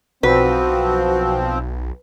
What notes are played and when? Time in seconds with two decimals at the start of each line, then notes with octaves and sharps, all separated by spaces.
0.23 B1 F3 C4 F#4 B4